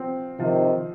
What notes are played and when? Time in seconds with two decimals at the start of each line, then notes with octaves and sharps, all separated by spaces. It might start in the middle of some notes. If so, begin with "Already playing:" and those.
Already playing: F3 C4
0.39 C3 D#3 F3